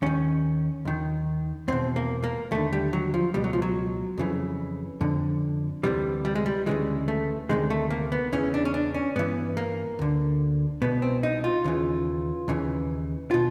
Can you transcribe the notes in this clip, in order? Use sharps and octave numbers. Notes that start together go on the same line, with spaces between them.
D#2 D#3 C#4
D#2 D#3
E2 B2 C4
A#3
A#3
D#2 D3 A3
G3
F#3
F3
C#2 B2 G3
F#3
F3
F#3
F2 C#3 E3
F2 D3
D2 C3 E3 G3
G3
G#3
G3
D2 C#3 E3 G#3
A3
D2 C3 D#3 G#3
A3
A#3
B3
E2 C#3 E3 C#4
D4
C#4
D4
C#4
G2 E3 B3
A#3
D2 D3
C2 B2 B3
C4
D#4
F4
D#2 C#3 E3
D#2 C#3 E3
B2 F4